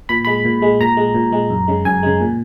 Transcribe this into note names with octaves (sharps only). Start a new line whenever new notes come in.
A#2 B5
G#3 B5
A#2
G#3
A#2 A#5
G#3
A#2
G#3
F#2
C#3 G#3
F#2 G#5
C#3 G#3
A#2